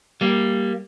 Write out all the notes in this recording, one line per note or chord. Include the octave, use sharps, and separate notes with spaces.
G3 A#3